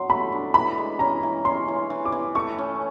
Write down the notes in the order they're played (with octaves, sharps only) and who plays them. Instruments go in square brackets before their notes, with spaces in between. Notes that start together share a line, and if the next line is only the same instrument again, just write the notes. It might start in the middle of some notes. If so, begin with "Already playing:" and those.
Already playing: [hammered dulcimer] F#3 [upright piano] C6
[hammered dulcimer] A3 [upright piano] B5
[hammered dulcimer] D4
[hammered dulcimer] E3 [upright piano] B5
[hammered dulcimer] G#3
[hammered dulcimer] C#4 [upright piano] A#5
[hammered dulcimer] E3
[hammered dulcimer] C#4 [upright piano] C6
[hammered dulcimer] E3
E3
[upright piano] D6
[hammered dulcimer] E3
[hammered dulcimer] A3 [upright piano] C#6
[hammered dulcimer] C#4